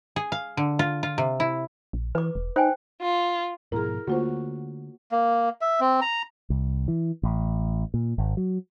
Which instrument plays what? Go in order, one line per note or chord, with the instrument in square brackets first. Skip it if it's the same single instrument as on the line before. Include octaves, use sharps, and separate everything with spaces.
[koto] G#4
F5
D3
F4
F4
C3
E4
[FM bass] A#1
[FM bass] E3 [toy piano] B4 D6
[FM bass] E1
[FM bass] D#4 [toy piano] C5 G5 G#5
[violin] F4
[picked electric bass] G#2 B2 F3 [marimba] E4 G#4 [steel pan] A#4
[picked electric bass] D3 A3 [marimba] A#3 F4 C5 [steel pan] F#4
[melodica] A#3
E5
C4
A#5
[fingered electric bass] C2
E3
A1
A#2
G#1
F#3